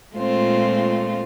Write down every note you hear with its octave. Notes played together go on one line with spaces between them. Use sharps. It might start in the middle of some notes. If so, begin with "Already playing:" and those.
A#2 G#3 A3 C4 F4